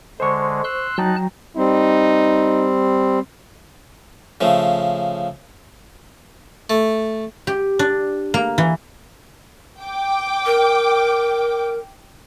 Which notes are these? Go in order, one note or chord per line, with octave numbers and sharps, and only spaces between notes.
D3 G#3 C5 C#6
C6 E6 F#6
F#3 D#4 G5 A5 A#5 F#6
G3 C4 D#4
C#3 F3 A3
A3
G4
D4
A#3
E3
G5 D6
A#4